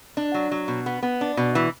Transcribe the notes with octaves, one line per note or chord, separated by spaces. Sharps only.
D4
F#3
F#3
B2
B3
B3
D4
B2
E3